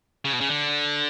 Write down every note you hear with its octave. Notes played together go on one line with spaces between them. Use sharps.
C#3
B2
C#3
D3